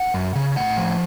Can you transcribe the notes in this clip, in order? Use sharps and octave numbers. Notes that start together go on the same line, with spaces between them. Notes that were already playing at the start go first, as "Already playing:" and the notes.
Already playing: F#5
F#2
C#3
A2 F#5
F3